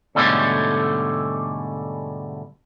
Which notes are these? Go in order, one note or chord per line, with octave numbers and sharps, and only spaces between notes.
G#2 B2 D3 G3 A3 C#4